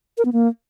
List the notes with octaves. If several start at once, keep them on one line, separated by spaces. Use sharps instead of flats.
A#4
B3
A#3